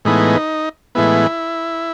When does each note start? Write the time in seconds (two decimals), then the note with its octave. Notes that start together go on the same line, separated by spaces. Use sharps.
0.05 A2 E3 G#3 B3 D#4
0.95 A2 E3 G#3 B3 E4